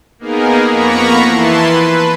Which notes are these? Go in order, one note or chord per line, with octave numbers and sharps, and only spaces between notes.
A#3 B3 D#4 G#4 A#4
F2 A#3 B3 A#5 B5 C#6
E3 E4 B4 A5 C6
B4